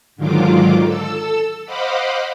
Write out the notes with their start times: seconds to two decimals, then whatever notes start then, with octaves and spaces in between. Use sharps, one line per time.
0.16 G#2 D3 D#3 F#3 F4 D6
0.84 A4 E6
1.65 C5 D#5 F5 F#5 B5 D6